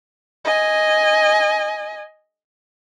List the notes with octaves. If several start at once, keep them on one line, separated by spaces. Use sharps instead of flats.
D#5 G#5